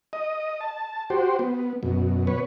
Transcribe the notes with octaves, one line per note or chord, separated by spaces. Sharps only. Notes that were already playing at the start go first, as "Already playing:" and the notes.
D#5
A5
F#4 G4 C5
B3
F#2 B2
B2 B4 C#5